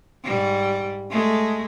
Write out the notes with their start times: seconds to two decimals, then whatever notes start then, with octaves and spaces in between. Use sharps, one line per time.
0.24 G#2 G3
1.10 G#3 A3